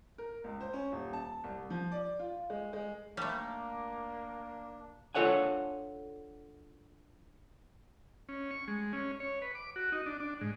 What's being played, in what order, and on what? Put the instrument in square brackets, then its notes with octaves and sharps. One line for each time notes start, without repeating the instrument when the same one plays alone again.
[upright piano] A#4
C#2
C5
C#4
D#1
A5
C2
F3
D5
F4
G#3
G#3
[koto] G3 A3 [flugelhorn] A#3 [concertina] D4
[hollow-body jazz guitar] D4 F4 A4 C#5 F#5 G#5
[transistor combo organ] C#4
C#6
G#3
C#4
C#5
B4
D6
F#4
D#4
D4
D4
G#2